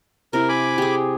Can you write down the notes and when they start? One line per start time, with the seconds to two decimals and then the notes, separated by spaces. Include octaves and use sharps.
0.33 C3 E4 A#4
0.49 G#5 B5 D6
0.78 G4 G#4